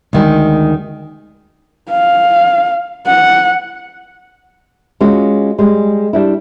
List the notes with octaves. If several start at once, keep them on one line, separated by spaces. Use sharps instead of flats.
D2 D#3 G#3
F5
F#5
G#3 C#4 F4 F#4
G3 G#3
G3 D4 E4